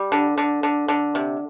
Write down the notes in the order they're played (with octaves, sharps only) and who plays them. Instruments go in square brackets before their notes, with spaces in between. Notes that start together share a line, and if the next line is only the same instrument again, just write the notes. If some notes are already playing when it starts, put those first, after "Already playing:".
Already playing: [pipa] G3
D3
D3
D3
D3
C3